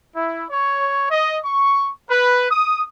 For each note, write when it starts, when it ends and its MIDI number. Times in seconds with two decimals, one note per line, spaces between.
0.16 0.45 64
0.50 1.05 73
1.11 1.38 75
1.44 1.90 85
2.10 2.50 71
2.51 2.84 87